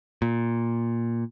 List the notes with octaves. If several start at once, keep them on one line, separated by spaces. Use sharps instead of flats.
A#2